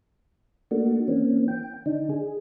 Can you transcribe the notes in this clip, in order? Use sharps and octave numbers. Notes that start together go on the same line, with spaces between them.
A3 A#3 D4 F#4
E3 A#3 C4 C#4
G5
D3 D4 D#4
G#4